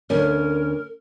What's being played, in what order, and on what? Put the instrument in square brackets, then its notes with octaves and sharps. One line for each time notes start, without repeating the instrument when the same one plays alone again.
[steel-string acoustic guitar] D2 C#4 [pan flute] A#4